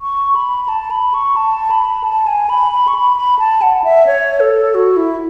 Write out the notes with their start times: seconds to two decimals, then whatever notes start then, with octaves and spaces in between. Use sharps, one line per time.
0.01 C#6
0.35 B5
0.65 B5
0.68 A5
0.91 B5
1.14 C#6
1.36 A5
1.71 B5
2.04 A5
2.27 G#5
2.49 B5
2.72 B5
2.88 C#6
2.95 B5
3.16 B5
3.39 A5
3.62 F#5
3.84 E5
4.07 C#5
4.40 A4
4.74 F#4
4.97 E4